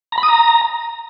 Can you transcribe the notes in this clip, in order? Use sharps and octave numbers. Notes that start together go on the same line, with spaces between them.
A#5
B5
D#6
A#5